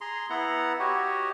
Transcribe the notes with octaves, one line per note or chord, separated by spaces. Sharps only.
G#4 A#5 C6
B3 E4 F#5 A#5
F#4 G4 C#5 D#5